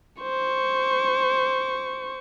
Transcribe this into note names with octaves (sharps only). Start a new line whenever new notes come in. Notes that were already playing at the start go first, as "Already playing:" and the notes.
C5 C#6